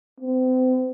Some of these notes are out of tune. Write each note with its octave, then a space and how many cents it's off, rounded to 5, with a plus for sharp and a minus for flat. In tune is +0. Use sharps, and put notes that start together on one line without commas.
C4 -35